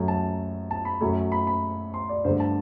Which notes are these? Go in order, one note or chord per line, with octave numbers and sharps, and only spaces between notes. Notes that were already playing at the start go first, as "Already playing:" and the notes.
Already playing: F#2 F#3 A3
A5
A5
B5
F#2 F#3 A3
B5
B5
C6
D5
G2 D3 A3 C5
A5